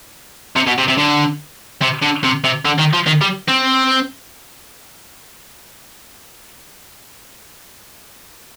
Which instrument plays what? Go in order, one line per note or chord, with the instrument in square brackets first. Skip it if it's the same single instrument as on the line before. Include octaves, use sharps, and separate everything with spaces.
[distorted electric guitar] C3
B2
C3
C3
D3
C3
D3
C3
C3
D3
D#3
F3
D#3
G3
C4